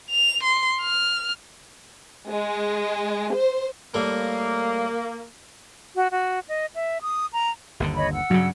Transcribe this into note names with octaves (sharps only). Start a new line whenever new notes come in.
F7
C6
F6
G#3
C5
A2 G3 A3 A#3
F#4
F#4
D#5
E5
D#6
A#5
G1 D#2 D3
C#5 D#5 B5
F#5 E6
G2 C#3 F#3